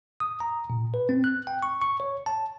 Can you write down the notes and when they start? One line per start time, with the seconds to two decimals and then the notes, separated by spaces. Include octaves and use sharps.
0.20 D#6
0.40 A#5
0.70 A#2
0.94 B4
1.09 C4
1.24 F#6
1.47 G5
1.62 C#6
1.82 C#6
2.00 C#5
2.26 A5